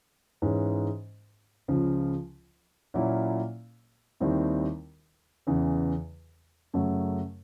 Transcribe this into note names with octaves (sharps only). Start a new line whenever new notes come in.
G#2 E3 G#3 C#4
C#2 C#3 F3
A#2 F#3 A#3 C#4 E4
D#2 D#3 G3 C4 E4
E2 C#3 E3
F#2 C#3 F#3 A3